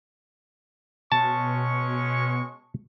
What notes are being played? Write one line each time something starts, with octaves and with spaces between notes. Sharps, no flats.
B2 G#3 C#4 A5 C#6